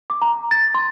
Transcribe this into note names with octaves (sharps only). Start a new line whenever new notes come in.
D6
A#5
A6
C6